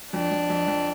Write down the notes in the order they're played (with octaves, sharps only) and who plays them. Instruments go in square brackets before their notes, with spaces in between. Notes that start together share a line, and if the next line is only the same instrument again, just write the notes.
[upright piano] F2 [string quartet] D4
[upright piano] F2
F2
F2